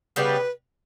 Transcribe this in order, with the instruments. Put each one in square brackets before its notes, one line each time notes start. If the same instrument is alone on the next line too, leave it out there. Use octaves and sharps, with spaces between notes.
[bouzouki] C#3 G3 B3 G4 [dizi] B4